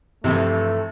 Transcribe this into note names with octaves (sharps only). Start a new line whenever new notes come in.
G2 C3 E3 F3 A3